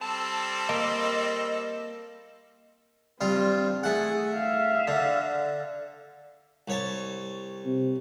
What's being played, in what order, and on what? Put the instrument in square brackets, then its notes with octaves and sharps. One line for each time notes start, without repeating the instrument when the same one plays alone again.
[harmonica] G3 C4 A4 [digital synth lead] A5
[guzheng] A#3 [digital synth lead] D#5
[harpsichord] G2 F4 [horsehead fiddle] C4
[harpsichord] A3 F#5 [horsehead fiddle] G#4
[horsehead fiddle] E5 F5
[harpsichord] D3
C2 C#5 A5
[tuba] C3